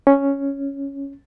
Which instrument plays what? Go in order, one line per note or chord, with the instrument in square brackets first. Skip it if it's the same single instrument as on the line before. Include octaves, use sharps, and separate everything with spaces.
[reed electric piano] C#4